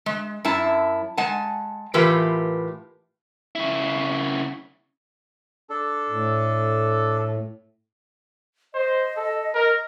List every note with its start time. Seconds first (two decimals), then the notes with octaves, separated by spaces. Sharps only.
0.06 G#3
0.45 F#2 E4 A5
1.18 G#3 F#5 G#5 A5
1.94 A2 E3 F4 G4 A#4 B4
3.55 C#3 E4
5.70 D4 A4
6.10 A2
8.74 C5 D#5
9.17 A4
9.55 A#4